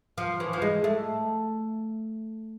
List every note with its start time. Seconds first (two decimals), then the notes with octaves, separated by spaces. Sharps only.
0.18 F3
0.40 E3
0.53 F3
0.62 G#3
0.84 A3